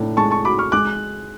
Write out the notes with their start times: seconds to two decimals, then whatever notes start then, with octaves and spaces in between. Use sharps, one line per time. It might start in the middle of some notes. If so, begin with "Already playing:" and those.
Already playing: A2 D4
0.17 G#3 A5 C#6
0.30 A5 C#6
0.45 F#4 B5 D6
0.58 C#6 F6
0.72 G#3 D6 F#6